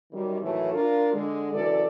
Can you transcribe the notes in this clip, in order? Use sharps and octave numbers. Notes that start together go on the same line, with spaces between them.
F#2 D#3 G3
A2 D#3 E3 F#3 A3
D4 F4 A#4
D3 G#3
F#2 C#3 E3 A4 D5